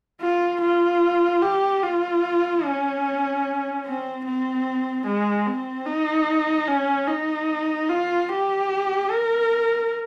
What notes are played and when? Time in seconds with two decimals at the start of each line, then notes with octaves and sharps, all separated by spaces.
0.21 F4
0.61 F4
1.42 G4
1.82 F4
2.64 C#4
3.85 C4
4.25 C4
5.06 G#3
5.46 C4
5.86 D#4
6.68 C#4
7.08 D#4
7.89 F4
8.29 G4
9.10 A#4